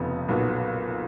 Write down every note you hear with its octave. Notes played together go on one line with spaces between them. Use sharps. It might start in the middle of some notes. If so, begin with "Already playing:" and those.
Already playing: F1 F2 C#3 F3 B3
B1 A#2 F#3 B3 F#4